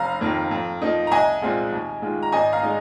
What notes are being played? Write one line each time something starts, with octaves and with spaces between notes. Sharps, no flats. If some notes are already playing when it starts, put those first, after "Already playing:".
Already playing: F1 F5 A#5
F2 D#3 A#3
F2
F3 A#3 D#4
A#5
C2 D#5 G#5
A#2 G#3 C4 F4
D#2
D#3 G#3 F4
A#5
G#1 D#5 G#5
F5 A#5
G#3 D#4